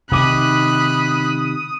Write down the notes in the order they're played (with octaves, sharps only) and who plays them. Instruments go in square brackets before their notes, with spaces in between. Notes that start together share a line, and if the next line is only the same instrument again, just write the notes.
[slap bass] C3 D#3 [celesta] D#4 D6 D#7 [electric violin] B5 F#6 [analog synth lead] D#6